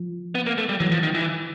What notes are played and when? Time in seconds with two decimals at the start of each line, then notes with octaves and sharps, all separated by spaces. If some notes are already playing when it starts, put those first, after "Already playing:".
Already playing: F3
0.35 B3
0.47 A#3
0.58 A3
0.69 G3
0.80 E3 F#3
0.92 F3
1.03 D#3
1.15 E3